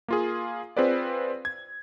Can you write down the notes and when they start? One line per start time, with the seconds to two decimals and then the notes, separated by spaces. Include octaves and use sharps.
0.08 A#3 F4 G#4
0.77 C4 F4 G#4 B4 C5 D5
1.45 G#6